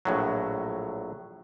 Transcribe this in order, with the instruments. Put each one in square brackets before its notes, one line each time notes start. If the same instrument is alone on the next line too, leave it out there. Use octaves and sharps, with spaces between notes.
[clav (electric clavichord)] A#1 A2 F#3